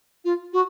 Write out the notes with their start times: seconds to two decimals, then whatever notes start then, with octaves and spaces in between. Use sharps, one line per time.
0.24 F4
0.53 F#4